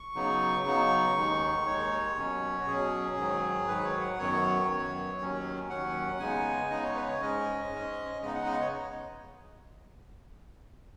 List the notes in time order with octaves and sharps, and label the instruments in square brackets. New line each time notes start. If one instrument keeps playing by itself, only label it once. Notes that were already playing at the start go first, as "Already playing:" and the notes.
Already playing: [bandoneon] C#6
C#3 F#3 B3 D#4
C#3 F#3 B3 D#4
D#2 D#3 G#3 D#4
D#2 D#3 G#3 D#4 C#5
B2 F#3 C#4
F#4
B2 F#3 C#4 G#4
G#2 D#3 F#3
G#2 D#3 F#3 B4
C#5
F#5
F#2 D#3 F#3 B3 C#5
F#2 D#3 F#3 B3
D#2 D#3 F#3 C#4
D#2 D#3 F#3 C#4 F#5
C#3 G#3 B3 D#4 G#5
C#3 G#3 B3 D#4 D#5
C#5
B4
C#5
G#2 G#3 C#4 D#5
G#2 G#3 C#4
C#3 G#3 B3 D#4 D#5
F#5
D#5
C#5